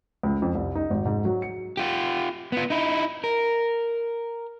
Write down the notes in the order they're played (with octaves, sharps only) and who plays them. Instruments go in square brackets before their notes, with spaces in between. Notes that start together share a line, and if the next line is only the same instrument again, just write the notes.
[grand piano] C#2
F2
C2
D#4
G#1
G#2
F#3
C#7
[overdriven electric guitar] F4 G4
B3 F4
D#4 E4
A#4